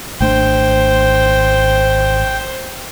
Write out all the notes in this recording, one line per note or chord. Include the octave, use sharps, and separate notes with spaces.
G#1 A3 D4 C5 G5